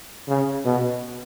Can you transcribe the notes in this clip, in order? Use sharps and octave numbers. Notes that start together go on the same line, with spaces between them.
C#3
B2